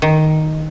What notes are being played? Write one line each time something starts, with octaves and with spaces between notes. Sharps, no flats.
D#3